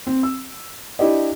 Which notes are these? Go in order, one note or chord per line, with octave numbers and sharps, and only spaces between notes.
C4
E6
D4 E4 G4 D5 D#5